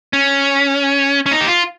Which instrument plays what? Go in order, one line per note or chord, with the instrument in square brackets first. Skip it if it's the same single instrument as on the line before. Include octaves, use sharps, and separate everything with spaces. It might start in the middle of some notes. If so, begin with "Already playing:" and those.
[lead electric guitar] C#4
C#4
D#4
G4
F4